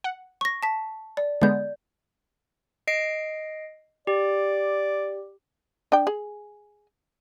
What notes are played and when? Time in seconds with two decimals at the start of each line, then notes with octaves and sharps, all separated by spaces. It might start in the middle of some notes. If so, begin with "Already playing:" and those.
0.04 F#5
0.41 C#6 A#6
0.63 A5 B6
1.17 D5
1.42 D3 G#3 B3 D5 G6
2.87 D#5 C7 D7
4.07 G4 D5
5.92 D4 G5
6.07 G#4